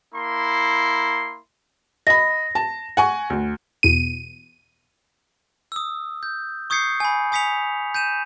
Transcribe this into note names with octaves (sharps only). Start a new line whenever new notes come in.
A#3 E4 C6
D#5 B5 A#6
A5
F#5 G#5 C#6
D2
E2 B2 D#7
D#6 E6
G6
C#6 D#6 G6 G#6 C7 C#7
G#5 B5
G#5 D#6 B6 C#7 F7
G6 D#7 E7